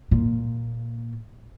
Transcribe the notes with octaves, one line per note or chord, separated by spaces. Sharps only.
A#2